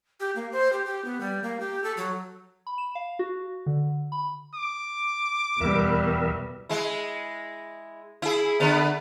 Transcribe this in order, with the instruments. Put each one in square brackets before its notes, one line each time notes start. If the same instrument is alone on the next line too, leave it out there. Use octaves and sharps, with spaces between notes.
[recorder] G4
A#3
C5
G4
G4
B3
G3
A#3
G4
A4
F#3
[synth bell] B5
E7
F5
F#4
D3
B5
[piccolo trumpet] D6
[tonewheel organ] E2 A#4 E5 [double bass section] B2 G3 B3
[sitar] G#3 E4
E4 G#4
D3 B3